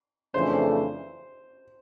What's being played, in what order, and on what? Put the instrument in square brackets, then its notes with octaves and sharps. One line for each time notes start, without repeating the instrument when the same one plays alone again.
[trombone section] F2 C#3 E3 A3 D4 [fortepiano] C5